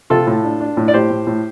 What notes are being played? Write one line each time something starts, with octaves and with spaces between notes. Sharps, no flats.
C3 F4 A4
A2
D4
D4
A2
D5
A2 G4 C5
A2
A2